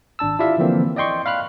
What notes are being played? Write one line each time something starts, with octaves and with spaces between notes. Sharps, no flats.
G#1 D4 A5 E6
E4 F4 G4 D5 E5 F5
D3 E3 F3 A#3 C4
D5 D#5 G5 C6 C#6
F5 B5 F6 F#6